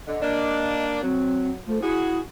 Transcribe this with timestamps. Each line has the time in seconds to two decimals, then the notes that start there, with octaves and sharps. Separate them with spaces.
0.07 D3 D#5
0.22 A#3 D4
1.02 F#3 C4
1.67 F3 A3
1.82 E4 F#4 G#4